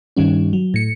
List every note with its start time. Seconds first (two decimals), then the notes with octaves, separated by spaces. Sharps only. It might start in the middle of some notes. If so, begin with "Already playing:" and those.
0.17 G2 D#3 G3 C#4
0.53 F#3
0.74 A2 C#7